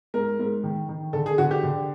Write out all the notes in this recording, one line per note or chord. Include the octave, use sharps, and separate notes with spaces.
G#2 A#4
G#2
D#3
D#3
D3 A4
G#4
D3 F#4
G4
D3